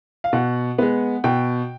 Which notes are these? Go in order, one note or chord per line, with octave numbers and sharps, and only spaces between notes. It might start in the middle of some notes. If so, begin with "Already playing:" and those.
F5
B2 F#5
G#3 B3
B2 G5